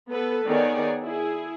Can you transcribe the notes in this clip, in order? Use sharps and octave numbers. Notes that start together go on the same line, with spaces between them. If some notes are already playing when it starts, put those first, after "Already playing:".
B3 A4 B4
D#3 B3 G#4 C#5 D5
E4 G#4